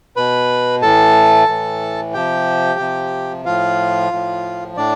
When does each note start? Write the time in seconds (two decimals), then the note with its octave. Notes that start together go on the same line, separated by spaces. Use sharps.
0.16 B2 B4 B5
0.82 A2 E3 A4 A5
1.48 A2 E3
2.14 C3 F3 G4 G5
2.79 C3 F3
3.45 A2 F3 F4 F5
4.12 A2 F3
4.77 A2 D4 D5